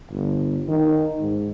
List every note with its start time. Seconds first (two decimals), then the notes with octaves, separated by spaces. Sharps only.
0.12 G1
0.69 D#3
1.21 G#2